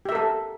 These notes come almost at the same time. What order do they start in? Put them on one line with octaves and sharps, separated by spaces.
G4 E5 A#4 A4